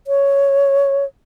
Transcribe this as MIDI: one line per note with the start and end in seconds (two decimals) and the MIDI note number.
0.07 1.05 73